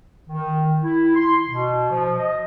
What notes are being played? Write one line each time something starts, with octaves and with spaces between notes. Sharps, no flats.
D#3
E4
C6
B2
F3
D#5